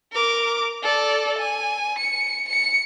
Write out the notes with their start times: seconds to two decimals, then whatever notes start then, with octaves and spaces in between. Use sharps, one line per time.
0.12 A#4 D6
0.83 A4 D5
1.39 G#5
1.99 C#7
2.49 C#7